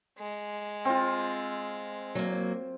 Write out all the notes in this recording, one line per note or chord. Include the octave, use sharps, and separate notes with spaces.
G#3
C4 F4
F#3 A#3